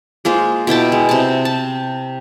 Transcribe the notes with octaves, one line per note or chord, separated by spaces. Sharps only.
G#3 A#3 F4 C5
B2 E4 G5 A5
G#3
C3 A5
A5